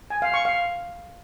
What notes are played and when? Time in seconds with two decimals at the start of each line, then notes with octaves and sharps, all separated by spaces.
0.10 G#5
0.22 F5
0.34 C#6
0.45 F5